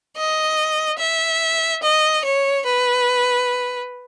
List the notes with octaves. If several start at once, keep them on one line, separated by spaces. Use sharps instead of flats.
D#5
E5
D#5
C#5
B4